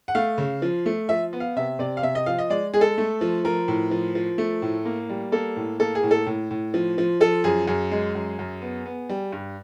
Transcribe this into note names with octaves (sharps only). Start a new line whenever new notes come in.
F#5
A3 F5
C#3
F3
A3
F3 E5
B3
F5
C3 E5
C3 D5
F5
C3 E5
D#5
F3 F5
D#5
G#3 D5
G#3 G#4
A4
A3
F3
F3 A#4
A2
F3
F3
A3
A2
A#3
G3
A#3 A4
A2
A#3 A4
G#4
A2
A4
A2
A2
F3
F3
F3 A4
F#2 G#4
F#2 G#4
G#3
F#2
F#2
B3
B3
G3
G2